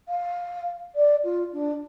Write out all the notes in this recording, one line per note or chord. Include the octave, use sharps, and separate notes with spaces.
F5
D5
F4
D4